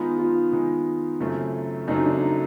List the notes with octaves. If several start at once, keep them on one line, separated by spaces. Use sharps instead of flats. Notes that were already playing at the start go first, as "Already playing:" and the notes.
Already playing: D#3 G#3 B3 D#4 F4
F4
D#3 G#3 B3 D#4
F#2 C#3 F#3 A3 C4
F#2 C#3 F#3 A3 C4 D#4
D4
D#4